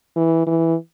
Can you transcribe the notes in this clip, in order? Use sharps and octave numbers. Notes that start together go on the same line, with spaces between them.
E3
E3